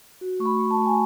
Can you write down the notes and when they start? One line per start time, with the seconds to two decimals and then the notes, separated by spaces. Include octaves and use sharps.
0.21 F#4
0.40 A3 C#6
0.46 B5
0.59 A3
0.71 A5
0.77 A3
0.86 G#5